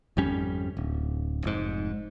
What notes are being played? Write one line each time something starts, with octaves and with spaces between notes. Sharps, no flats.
G#1 F2 G3 C#4
D1
F1 G#2